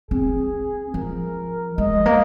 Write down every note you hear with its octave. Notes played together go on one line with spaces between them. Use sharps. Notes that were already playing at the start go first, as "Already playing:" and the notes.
C4 G#4
F3 A#4
G#3 D#5
A#3